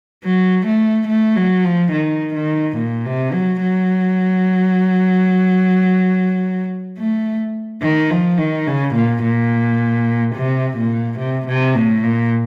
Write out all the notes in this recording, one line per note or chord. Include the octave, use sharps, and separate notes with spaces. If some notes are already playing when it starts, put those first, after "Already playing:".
F#3
A3
A3
F#3
F3
D#3
D#3
A#2
C3
F#3
F#3
A3
D#3
F3
D#3
C#3
A#2
A#2
C3
A#2
C3
C3
A2
A#2